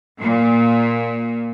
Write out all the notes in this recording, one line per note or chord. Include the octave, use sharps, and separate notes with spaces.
A#2